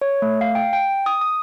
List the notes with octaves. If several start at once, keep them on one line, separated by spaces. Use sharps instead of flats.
C#5
A3
F5
G5
G5
D#6
D#6